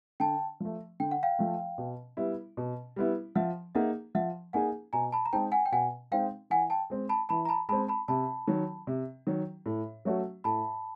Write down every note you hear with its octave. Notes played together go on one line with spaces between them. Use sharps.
D3 G5 A5
F3 A3
D3 G5
F#5
F5 G5
F3 A3
B2
G3 B3 E4
B2
G3 B3 E4
F3 E5 F#5
A#3 D#4 G#4 E5 F#5
F3 E5 F#5
A#3 D#4 G#4 F#5 G#5
B2 G#5 A#5
A5 B5
A#5
G#3 C4 D#4 G5 A5
F#5 G#5
G5
B2 F#5 G#5
G#3 C4 D#4 F5 G5
E3 F#5 G#5
G5 A5
G#3 C4
A5 B5
E3 A5 B5
A#5
A5 B5
G#3 C4 A5 B5
A5 B5
C3 A5 B5
D#3 F#3
C3
D#3 F#3
A2
F#3 A3 C#4 F#4
A2 A5 B5